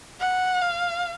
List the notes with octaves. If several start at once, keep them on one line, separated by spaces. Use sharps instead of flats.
F#5
F5